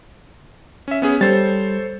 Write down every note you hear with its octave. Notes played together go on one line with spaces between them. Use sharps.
C#4 E5
B3 C#4 G#4
G3 A4 C5 C#5 A6